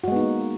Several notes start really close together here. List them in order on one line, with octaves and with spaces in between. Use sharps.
F#4 G#3 B3 D#4 A#3